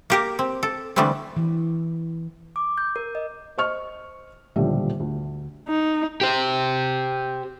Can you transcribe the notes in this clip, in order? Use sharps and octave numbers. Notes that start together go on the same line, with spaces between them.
A#3 G4 A#4
C4
A4
D3 E3 G3 A3 B3 C4
E3
D6
G6
A#4
D#5
C5 D#5 C#6 F6
D#1 B1 D3 F3 G3 E5
D2
D#4
G4 C5